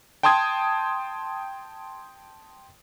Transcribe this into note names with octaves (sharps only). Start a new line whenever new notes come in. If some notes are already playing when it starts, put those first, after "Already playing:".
G5 A5 C6 D#6 G#6